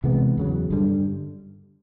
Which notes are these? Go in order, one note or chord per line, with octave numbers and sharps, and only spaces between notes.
C3 E3 G#3 B3
E2 C#3 F#3
G2 D3 G3